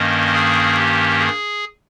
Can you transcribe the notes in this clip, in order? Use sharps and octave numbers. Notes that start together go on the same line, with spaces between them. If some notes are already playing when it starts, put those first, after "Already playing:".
Already playing: G2 D#3 A#3 C#4 D#5
G#4
G4
G#4